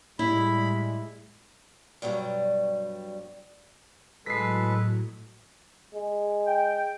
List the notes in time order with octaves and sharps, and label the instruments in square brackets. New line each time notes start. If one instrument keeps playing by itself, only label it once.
[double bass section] A2 G3 G#3 [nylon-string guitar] E4 [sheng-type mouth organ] B5
[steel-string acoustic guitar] G2 B2 F#3 G3
[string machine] A2 F#3 [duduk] G#3 [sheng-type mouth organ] A4 B4 [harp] B6 C7
[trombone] G#3
[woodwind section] G5